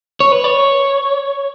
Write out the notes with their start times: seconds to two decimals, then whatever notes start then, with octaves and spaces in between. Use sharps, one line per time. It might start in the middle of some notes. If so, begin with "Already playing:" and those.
0.20 C#5
0.32 B4
0.44 C#5